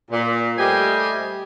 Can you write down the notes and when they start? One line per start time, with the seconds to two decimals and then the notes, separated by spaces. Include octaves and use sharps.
0.11 A#2
0.58 G3 A3 G4 C5 D#5 G#5